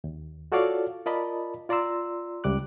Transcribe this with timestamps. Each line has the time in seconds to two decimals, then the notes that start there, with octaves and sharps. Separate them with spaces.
0.04 D#2
0.52 F4 F#4 A4 C#5 D5 F5
1.06 F4 A#4 D5 D#5 A5 B5
1.69 F4 D5 A#5 C6 E6
2.44 C#2 G3 D6 F#6